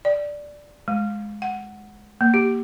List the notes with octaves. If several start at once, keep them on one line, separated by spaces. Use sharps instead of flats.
D5
G#3
F#5
A#3
G4